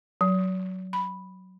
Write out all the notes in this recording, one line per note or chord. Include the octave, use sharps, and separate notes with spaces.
F#3
B5